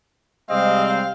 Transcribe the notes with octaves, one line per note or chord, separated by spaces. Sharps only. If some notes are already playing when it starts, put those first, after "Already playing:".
C3 G3 G#3 C4 D#5 F5